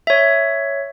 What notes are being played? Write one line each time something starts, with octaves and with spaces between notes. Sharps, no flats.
C#5 E5